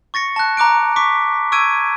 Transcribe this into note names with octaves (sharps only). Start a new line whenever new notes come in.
C#6 A6 A#6 C#7
A5 F#6
A#5 D6 F#6 D7
C#6 D6 B6
C#6 E6 G#6 D7 D#7